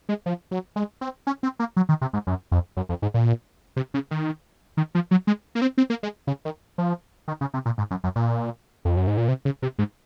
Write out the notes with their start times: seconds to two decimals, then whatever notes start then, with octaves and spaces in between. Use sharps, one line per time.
0.09 G#3
0.26 F3
0.51 F#3
0.76 G#3
1.01 C4
1.27 C#4
1.43 C4
1.59 A#3
1.76 F#3
1.89 D#3
2.01 C3
2.13 G#2
2.27 F#2
2.52 F2
2.77 F#2
2.89 F2
3.02 G#2
3.14 A#2
3.76 C3
3.94 C#3
4.11 D#3
4.77 D#3
4.95 F3
5.11 F#3
5.27 G#3
5.55 A#3
5.62 C4
5.78 C4
5.90 A#3
6.03 G#3
6.27 C#3
6.45 D#3
6.78 F3
7.28 D#3
7.41 C#3
7.54 C3
7.66 A#2
7.78 G#2
7.91 F#2
8.04 F#2
8.16 A#2
8.85 F2
8.96 F#2
9.07 G#2
9.17 A#2
9.28 C3
9.45 C#3
9.62 C3
9.79 G#2